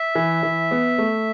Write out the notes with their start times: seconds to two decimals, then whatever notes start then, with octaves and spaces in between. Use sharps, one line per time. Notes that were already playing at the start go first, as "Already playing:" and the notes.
Already playing: E5
0.15 E3
0.43 E3
0.71 B3
0.98 A3